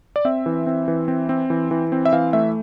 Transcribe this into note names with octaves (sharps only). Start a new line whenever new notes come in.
D5
C4 E5
E3
C4
E3
C4
C4
E3
E3
C4
E5
E3 F5
A3 E5